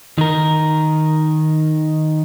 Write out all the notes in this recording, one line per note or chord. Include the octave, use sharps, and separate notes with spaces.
D#3 A#4